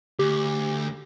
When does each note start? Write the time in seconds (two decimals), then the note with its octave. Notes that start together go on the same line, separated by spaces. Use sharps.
0.19 D2 G4